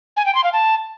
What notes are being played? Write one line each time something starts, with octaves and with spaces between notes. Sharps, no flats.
G#5
G5
C6
F5
A5